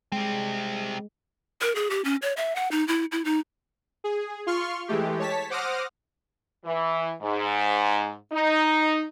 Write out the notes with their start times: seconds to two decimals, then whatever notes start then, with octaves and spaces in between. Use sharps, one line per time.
0.12 G3 G#3 C4
1.61 A#4
1.76 G#4
1.90 G4
2.05 C#4
2.22 C#5
2.37 E5
2.56 F#5
2.71 D#4
2.88 E4
3.12 E4
3.25 D#4
4.04 G#4
4.47 F4 C6 C#6 F6
4.88 E3 G#3 A3 G4
5.19 C#5 A5 B6
5.50 C5 F#5 D6 D#6 F6 A#6
6.65 E3
7.22 G#2
8.33 D#4